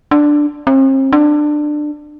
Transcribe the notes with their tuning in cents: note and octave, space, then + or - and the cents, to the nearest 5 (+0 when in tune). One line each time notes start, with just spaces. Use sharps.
D4 +5
C4 +40
D4 +20